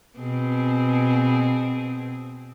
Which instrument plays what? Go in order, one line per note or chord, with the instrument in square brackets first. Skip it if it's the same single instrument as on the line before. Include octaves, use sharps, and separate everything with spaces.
[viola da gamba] B2 C4 G#4